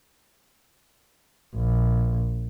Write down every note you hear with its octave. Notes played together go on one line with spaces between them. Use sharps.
A#1